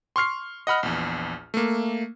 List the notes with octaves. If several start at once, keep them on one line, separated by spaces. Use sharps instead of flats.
C6 C#6 F6 C7
D#5 F#5 B5 F6
A#1 E2
A3 A#3